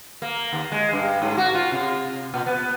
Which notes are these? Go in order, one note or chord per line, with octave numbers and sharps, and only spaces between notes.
A#3
D#2
G#3
G2
G#2
F#4
F4
C3
A#2
B3